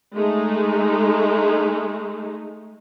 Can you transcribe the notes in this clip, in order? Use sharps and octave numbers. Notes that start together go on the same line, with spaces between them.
G#3 A3 D#4